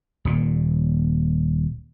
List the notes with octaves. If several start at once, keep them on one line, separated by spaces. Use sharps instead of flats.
D#1 A#2